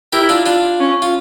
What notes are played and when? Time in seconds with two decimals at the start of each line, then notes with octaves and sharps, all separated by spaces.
0.13 E4 G4 A#4
0.29 D4 F4
0.46 D4 F4
0.80 C#4
1.02 F4